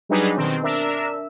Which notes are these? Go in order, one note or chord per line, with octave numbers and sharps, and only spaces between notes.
F#3 G3 D4 D#4 G#4 B4
B2 D#3 C4
D4 A#4 E5 E6